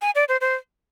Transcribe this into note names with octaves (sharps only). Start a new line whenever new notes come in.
G#5
D5
C5
C5